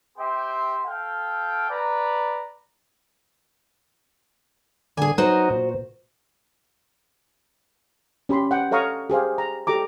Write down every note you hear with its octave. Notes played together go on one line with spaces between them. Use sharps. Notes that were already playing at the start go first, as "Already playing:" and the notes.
C4 G4 E5 G5 C6
A4 F5 G5
B4 D5 A#5
D3 G#4 G#5
F#3 D#4 F#4 C5
A#2
C#4 G4 B5 C6
F#5 G5
A4 C#5 F5 A#5 C#6 D#6
G4 G#4 C5 F5
A#5
G4 A4 A#5 D6